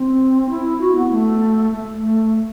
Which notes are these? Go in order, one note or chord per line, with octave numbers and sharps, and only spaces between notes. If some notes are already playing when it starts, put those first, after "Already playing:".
Already playing: C4
E4
F#4
B3
A3
A3
A3